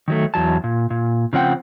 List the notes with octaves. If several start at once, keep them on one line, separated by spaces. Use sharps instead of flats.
D#3 F#3 A3
E2 F#3 A5
A#2
A#2
C#3 F3 C4 F#5 G5